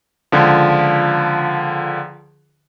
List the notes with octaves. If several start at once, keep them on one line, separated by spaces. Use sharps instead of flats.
C#2 D3 F3